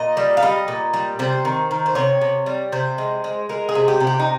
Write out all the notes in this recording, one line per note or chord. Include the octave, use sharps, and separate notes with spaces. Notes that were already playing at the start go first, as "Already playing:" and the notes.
Already playing: A#2 D#5
G3
F5
G3 D#5
A#2
G3
C3 C5
D#3
D#3
C5
C3 C#5
C3
G3
C3 C5
G#3
G#3
G#3 A#4
G#4
C3
G4
C3
G4
D#4